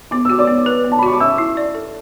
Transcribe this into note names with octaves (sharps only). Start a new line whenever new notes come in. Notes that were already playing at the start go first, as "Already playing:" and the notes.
B3 D6
F#4 E6
D5 D6
B3
B4
B3
A5
B5
F#4 C#6
D6
C#4 E5 E6
E4
D5
A4